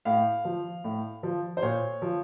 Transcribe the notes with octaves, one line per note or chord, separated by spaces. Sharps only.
A2 F5
F3
A2
F3
C5
A#2 C#5
F3